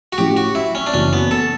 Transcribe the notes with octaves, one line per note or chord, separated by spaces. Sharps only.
F#4
A2 F#3 C#4 E4 G4
F#4
E4
C#4
D4
F#1 F#2 E3 C#4
B3
A4